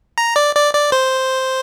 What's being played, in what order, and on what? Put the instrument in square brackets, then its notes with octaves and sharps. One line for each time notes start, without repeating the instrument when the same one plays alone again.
[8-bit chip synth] A#5
D5
D5
D5
C5